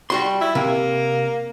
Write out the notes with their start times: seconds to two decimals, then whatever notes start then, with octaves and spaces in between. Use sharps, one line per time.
0.10 G3 F#4 C6
0.41 E4
0.55 C3 A#3